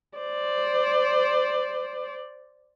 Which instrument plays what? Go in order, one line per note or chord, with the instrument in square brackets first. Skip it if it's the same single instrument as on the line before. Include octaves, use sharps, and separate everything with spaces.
[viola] C5 D5